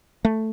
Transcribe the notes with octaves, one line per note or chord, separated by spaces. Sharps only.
A3